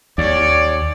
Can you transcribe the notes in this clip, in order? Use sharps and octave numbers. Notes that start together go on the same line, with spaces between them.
D#2 C#5 D5